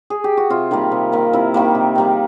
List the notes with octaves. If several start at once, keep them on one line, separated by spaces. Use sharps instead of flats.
G#4
G4
F#4
C3 F4
D#3 G3 A#3
C3
D#3 G3 A#3
C3 E4
D#3 G3 A#3
C3
D#3 G3 A#3